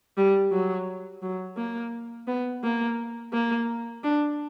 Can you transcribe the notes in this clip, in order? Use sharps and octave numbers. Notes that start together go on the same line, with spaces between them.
G3
F#3
F#3
A#3
B3
A#3
A#3
D4